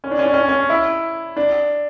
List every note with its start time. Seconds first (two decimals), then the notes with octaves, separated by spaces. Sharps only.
0.04 C#4
0.11 D4
0.19 C#4
0.26 D4
0.34 C#4
0.41 D4
0.49 C#4
0.70 E4
1.37 D4